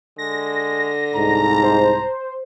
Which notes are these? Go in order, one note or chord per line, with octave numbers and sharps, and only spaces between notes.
D3 G#3 A#6
C2 G#2 A#5
C5